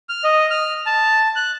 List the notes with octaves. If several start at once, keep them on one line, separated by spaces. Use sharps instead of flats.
F6
D#5
F6
A5
F#6